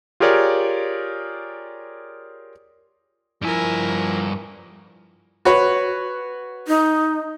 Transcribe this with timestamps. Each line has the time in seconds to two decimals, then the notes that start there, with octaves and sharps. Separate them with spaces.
0.20 F4 G4 G#4 A#4 C#5 D5
3.42 G2 F3 E4 A#4 G#5
5.45 F#4 B4 C#5
6.68 D#4